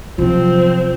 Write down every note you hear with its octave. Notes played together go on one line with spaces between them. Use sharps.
C3 F3 F#3 C4